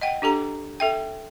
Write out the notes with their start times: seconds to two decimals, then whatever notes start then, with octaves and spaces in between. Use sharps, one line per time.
0.01 D#5 F#5 G5
0.22 D4 G4 A4 A#5
0.80 A4 E5 G5